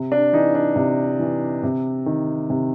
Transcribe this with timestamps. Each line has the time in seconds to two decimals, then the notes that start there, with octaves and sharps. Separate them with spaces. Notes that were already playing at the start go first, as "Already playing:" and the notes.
Already playing: C3
0.12 D4
0.33 E3 D#4
0.55 D4
0.76 C3
1.19 E3
1.63 C3
2.06 D#3
2.50 C3